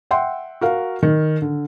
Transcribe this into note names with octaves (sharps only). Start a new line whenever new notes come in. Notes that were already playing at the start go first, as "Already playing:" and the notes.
E5 F#5 G5 C6
F#4 A#4 F5
D#3
D3